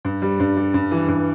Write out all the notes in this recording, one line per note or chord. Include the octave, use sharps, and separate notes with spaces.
G2
G3
G2
G3
G2
E3
G2